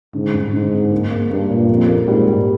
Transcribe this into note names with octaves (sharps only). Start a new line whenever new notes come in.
G#2 D3
G2
G#2 D3
C4
A#3
A#3
G2 A#3
A#2
F2 A#3
A#3
G#2 G3
G3